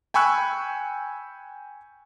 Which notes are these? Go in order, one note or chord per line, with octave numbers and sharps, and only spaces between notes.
G5 G#5 B5 C#6 E6 F#6